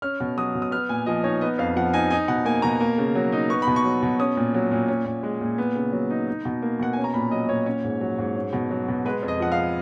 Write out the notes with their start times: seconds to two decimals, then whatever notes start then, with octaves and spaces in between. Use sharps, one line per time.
0.02 C#4 F6
0.20 B2
0.37 F#3 D#6
0.55 B2
0.62 D#6
0.71 B3 F6
0.89 A#2 G#5
1.06 F3 D#5
1.24 D#4 C#5
1.41 B3 D#5
1.58 F2 F5
1.76 F3 F#5
1.93 D#4 G#5
2.10 D#4 G#5
2.28 B2 F#5
2.45 A#3 G#5
2.62 B2 A#5
2.80 A#3
2.98 C#3
3.15 F#3
3.32 D#4
3.49 B3 C#6
3.62 B2 B5
3.76 C#6
3.84 F#3
4.02 B2
4.20 C#4 D#6
4.37 A#2
4.54 F#3
4.72 A#2
4.88 C#4
5.05 A#2
5.23 G#3
5.41 A#2
5.58 B3
5.75 C#3
5.92 F#3
6.10 D#4
6.28 D#4
6.45 B2
6.62 A#3
6.79 B2 F#5
6.93 C#4 G#5
7.04 A#5
7.14 A#2 B5
7.31 F#3 D#5
7.49 A#2 C#5
7.66 C#4
7.84 G#2
8.01 F#3
8.18 G#2
8.36 C#4
8.53 B2
8.71 F#3
8.88 B2
9.05 G#3 B4
9.23 F2
9.28 D#5
9.40 F3 F#5
9.52 F5